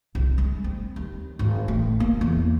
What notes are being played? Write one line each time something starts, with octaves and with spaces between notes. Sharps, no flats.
C2
G#3
C4
D#2
G#1
A1
A#3
E2